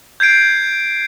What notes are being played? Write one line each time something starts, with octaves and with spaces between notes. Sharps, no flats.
G6 G#6 C7 D7